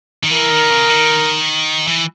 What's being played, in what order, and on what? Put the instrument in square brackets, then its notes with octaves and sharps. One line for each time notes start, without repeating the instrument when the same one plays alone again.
[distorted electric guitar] D#3
[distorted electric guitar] E3 [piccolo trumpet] A#4
[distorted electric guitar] D#3
C#3
D#3
E3